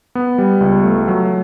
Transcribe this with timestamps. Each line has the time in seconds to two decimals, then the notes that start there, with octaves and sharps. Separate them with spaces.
0.15 B3
0.38 G3
0.61 C#2
0.84 A3
1.08 F#3